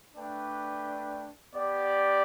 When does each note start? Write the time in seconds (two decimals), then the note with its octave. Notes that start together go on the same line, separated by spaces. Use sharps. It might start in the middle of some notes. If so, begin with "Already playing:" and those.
0.15 A3 D4 B4 D5 G5
1.54 B3 G4 D5